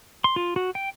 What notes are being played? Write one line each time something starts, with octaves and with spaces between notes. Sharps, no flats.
C6
F4
F#4
G5